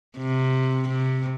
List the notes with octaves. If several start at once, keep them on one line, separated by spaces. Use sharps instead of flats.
C3
C3